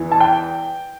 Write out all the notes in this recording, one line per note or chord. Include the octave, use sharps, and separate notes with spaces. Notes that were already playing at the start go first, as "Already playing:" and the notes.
Already playing: E2 E3
A5
G5